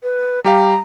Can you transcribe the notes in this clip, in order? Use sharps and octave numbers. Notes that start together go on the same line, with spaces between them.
B4
G3 G4 F5 A#5